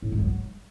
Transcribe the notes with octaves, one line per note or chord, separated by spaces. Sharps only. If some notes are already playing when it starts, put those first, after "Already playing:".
A2
G#2
F#3